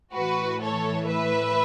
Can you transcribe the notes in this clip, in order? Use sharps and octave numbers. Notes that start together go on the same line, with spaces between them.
A2 E3 F#4 B4
A4 C#5
B4 E5